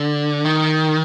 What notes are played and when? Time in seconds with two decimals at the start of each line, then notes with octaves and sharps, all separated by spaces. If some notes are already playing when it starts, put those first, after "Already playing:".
Already playing: D3
0.45 D#3